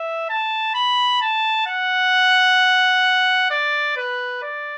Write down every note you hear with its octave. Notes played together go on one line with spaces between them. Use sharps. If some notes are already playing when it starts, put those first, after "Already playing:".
Already playing: E5
A5
B5
A5
F#5
D5
B4
D5